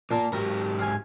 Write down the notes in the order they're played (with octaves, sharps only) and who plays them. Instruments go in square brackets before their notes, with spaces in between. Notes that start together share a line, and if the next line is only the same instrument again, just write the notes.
[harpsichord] A#2 A5 [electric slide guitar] A#3
[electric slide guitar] G#2 F#3 G4 [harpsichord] A#4
[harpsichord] F5 G#5